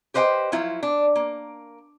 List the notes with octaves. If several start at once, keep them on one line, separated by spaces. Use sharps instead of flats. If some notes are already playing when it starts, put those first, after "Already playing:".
G4 B4 C5 D#5 F#5 G5
F3 F#3 E4 F4
D4
A#3